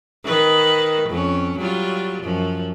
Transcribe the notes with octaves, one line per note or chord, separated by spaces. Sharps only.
D#3 B4
F2 C#4
F#3 G3 F4
F#2 F3